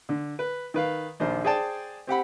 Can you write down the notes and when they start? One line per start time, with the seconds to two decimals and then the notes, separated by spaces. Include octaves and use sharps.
0.09 D3
0.39 B4
0.74 D#3 B4 F5
1.20 A#1 D#2 C5
1.45 G#4 C5 D5 G5 A5
2.07 C4 G4 F#5 B5